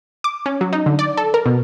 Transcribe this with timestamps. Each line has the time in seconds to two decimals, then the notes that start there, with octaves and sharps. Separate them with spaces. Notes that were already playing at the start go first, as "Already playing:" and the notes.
0.24 D6
0.46 C#4
0.61 F#3
0.73 D#4
0.86 D3
0.99 D5
1.17 A4
1.34 A#4
1.46 B2